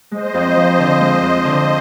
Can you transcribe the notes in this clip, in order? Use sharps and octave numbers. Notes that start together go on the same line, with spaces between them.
G#3 C5 D#5
F2
F3
D3
G#3
F2
D3